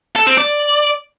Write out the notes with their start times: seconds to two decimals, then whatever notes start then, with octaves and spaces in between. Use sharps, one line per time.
0.16 A4
0.27 C4
0.38 D5